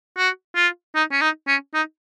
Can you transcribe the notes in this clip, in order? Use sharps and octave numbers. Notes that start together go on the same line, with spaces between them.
F#4
F4
D#4
C#4
D#4
C#4
D#4